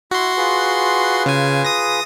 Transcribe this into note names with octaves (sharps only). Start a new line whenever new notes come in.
E4 F#4 E5 C6
F4 G#4 B4
C#3 G#5
D#6 A#6